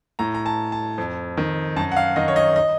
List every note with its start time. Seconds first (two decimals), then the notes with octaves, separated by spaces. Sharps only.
0.19 A2 A#5
0.35 A#5
0.46 A5
0.72 A5
0.98 F2
1.37 D#3
1.76 F#2 A5
1.92 F#5
1.97 F5
2.16 D#3 D#5
2.28 C#5
2.36 D#5
2.56 D#5